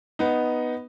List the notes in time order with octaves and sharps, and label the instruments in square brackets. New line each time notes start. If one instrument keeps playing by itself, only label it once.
[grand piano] B3 D#4